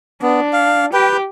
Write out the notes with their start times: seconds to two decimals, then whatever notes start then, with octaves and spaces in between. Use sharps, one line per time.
0.22 B3 D4
0.53 F5
0.93 G4 B4 G5